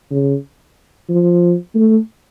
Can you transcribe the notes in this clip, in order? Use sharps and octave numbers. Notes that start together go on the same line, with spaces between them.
C#3
F3
A3